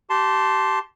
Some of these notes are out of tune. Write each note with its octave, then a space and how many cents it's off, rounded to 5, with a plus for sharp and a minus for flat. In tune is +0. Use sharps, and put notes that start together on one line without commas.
G4 -25 A5 +0 C6 +0